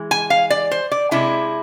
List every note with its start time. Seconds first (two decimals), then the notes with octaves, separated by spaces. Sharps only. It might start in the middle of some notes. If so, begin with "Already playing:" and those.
Already playing: E3 G#3
0.11 G#5
0.30 F5
0.50 D5
0.71 C5
0.91 D5
1.11 C3 G#3 D4 E4